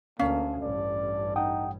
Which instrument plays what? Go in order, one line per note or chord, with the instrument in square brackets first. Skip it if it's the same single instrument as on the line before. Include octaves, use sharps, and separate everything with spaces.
[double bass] D2 [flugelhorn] A#3 [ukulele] C#4 F5
[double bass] A1 G2 [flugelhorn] D5
[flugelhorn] D#4 [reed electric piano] F#5 G5 D#6